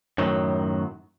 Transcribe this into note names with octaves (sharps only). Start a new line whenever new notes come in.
F#2 A2 D#3 F#3